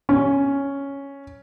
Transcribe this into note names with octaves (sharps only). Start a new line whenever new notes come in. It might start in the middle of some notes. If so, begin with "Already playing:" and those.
C#4